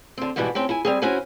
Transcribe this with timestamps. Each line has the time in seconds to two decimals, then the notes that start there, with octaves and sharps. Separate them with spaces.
0.18 D3 C4
0.36 G#2 B2 E3 G3 E4 F#4
0.55 A2 C4 C#4 G5
0.69 E4 G#5
0.85 G3 C4 G#4
1.02 C#4 E4 F#4 C5 G#5